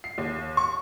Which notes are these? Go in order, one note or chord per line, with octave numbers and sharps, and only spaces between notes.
C7
D#2
C#6